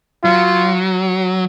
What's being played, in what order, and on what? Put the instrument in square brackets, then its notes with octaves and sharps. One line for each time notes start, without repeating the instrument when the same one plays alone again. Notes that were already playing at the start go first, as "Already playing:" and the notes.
[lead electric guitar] F#3 [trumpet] F4